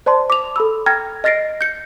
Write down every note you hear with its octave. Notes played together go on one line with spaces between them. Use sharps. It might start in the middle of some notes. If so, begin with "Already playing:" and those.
C5 D5 A5 C6
D6 F7
A4 B5 E6
G5 A#5 F6 G#6 A#6
D#5 F6 A6 A#6 C7 D7
G6 C#7